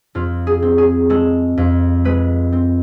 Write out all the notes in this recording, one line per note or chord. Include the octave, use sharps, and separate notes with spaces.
F2 F4
G#4
C4
G#4
G#3 A4
F2
G#3 B4
C4